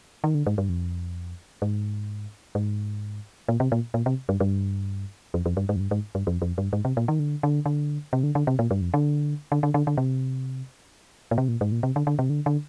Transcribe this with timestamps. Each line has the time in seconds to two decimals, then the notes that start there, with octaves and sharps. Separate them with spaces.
0.24 D#3
0.35 D3
0.46 G#2
0.58 G2
0.69 F2
1.62 G#2
2.55 G#2
3.48 A#2
3.60 C3
3.72 A#2
3.94 A#2
4.06 C3
4.29 G2
4.40 G2
5.34 F2
5.46 F2
5.57 G2
5.69 G#2
5.76 F2
5.80 G2
5.91 G#2
6.15 G2
6.27 F2
6.42 F2
6.58 G2
6.73 G#2
6.85 C3
6.97 A#2
7.08 D#3
7.19 D3
7.43 D3
7.66 D3
8.13 C3
8.23 D3
8.35 D3
8.47 C3
8.59 A#2
8.71 G2
8.81 F2
8.94 D3
9.52 D3
9.63 D3
9.74 D3
9.87 D3
9.97 C3
11.31 A#2
11.38 C3
11.48 A#2
11.61 G#2
11.72 A#2
11.83 C3
11.96 D3
12.07 D3
12.19 C3
12.30 D3
12.46 D3